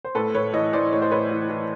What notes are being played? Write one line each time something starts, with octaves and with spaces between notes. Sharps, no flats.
C5
A2 A4 B4
A2 B4 C#5
E3 C#5 D#5
E3 C5 D5
A2 C#5
C5
A2 B4 C#5
E3
E3